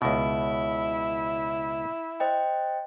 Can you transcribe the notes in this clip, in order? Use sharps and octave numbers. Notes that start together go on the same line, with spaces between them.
C#2 B2 E4
C5 D#5 G5